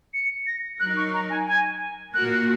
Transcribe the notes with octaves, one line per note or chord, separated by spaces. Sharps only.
C#7
A#6
F#3 D#4 A#4 F#6
C#6
A#5
G#5
G#5
A#2 A#3 F#4 A#4 F#6